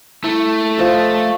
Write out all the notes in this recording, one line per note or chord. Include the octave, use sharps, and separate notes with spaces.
A3 E4
F3 D#5 F5